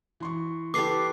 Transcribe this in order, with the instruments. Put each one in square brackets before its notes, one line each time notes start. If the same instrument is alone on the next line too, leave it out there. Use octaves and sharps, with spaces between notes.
[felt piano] E3 C6 C#6
[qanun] G4 A4 B4 [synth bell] D6 C7